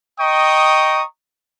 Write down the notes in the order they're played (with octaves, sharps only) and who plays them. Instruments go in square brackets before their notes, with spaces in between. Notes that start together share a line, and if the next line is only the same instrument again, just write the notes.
[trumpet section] D#5 G5 A#5 C#6 D#6